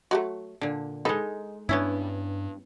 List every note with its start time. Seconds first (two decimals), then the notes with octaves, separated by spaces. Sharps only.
0.11 F#3 G#3 A3
0.61 A#2 D3 D4
1.05 G#3 D#4 A4 B4
1.69 G2 B3 C#4 D4 E4